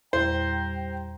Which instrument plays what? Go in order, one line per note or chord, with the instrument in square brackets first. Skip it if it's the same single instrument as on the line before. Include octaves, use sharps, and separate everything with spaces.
[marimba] E2 A#2 E4 [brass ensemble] G3 G5 A#5 [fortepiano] C5